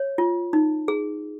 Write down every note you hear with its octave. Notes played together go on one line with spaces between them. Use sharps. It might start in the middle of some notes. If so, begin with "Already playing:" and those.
Already playing: C#5
F4
D#4
G#4